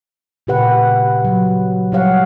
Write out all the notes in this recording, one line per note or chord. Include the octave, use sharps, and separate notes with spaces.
A#2 C#3 G4 B4 F#5
F#3
F#3 G3 G4 C#5 F5 F#5